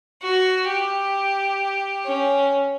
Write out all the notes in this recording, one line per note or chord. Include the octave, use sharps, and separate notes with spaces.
F#4
G4
C#4